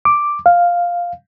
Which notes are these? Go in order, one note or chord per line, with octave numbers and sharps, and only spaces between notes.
D6
F5